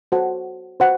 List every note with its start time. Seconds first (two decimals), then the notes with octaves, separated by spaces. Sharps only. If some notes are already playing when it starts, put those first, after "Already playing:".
0.12 F#4 A4 C5 F#5 A5
0.80 F#4 C5 F#5